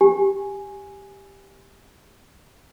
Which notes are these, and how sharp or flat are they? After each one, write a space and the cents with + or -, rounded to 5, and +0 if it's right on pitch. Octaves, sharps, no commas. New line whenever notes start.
G4 +0 G#5 +0